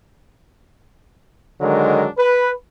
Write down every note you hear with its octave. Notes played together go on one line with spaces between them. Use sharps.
D3 D#3 F#3 G#3 D4 A#4
B4